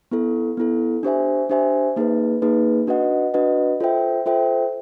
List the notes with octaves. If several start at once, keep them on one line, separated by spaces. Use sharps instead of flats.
B3 E4 A4
B3 E4 A4
D4 G4 C5 E5 G#5
D4 G4 C5 E5 G#5
A#3 D#4 G#4 B4
A#3 D#4 G#4 B4
D4 F#4 B4 D#5 F#5
D4 F#4 B4 D#5 F#5
F4 A4 C5 E5 G5
F4 A4 C5 E5 G5